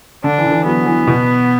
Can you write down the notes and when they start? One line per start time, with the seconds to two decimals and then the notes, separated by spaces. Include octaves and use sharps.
0.24 D3 D4
0.38 E3
0.46 D3
0.52 E3
0.66 F#3 B3
0.86 E3
1.07 B2